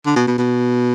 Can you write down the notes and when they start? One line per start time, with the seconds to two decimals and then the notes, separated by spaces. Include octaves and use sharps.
0.06 D3
0.16 B2
0.27 B2
0.38 B2